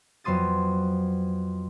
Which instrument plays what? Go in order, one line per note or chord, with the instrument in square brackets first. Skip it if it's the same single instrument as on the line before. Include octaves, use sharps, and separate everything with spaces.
[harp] F2 F#3 B3 C6 D#6 A6